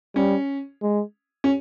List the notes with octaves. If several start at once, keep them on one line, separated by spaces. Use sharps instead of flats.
G3 C#4
G#3
C#4